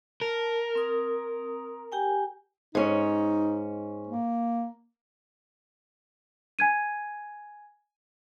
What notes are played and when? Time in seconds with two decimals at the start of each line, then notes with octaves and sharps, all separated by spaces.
0.21 A#4 A5
0.75 C4 D#6
1.92 G4 G5 G#5
2.75 G#2 C#4 D#4
4.07 A#3
6.59 G#5 G#6 D#7